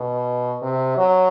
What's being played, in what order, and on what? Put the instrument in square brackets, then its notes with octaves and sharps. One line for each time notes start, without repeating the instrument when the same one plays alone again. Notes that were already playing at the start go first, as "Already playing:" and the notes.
Already playing: [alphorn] B2
C3
F#3